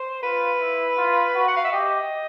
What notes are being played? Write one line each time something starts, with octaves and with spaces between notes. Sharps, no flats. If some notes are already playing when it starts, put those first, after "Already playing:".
Already playing: C5
F4 B4
E4
F4
F#4
F#5
F5
E5
G4 D#5